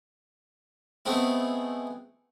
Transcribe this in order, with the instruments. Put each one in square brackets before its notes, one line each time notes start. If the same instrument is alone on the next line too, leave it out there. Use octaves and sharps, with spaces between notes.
[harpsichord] G#3 A3 B3 C4 E4